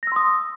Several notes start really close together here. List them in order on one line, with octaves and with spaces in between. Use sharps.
A#6 E6 C6 D#6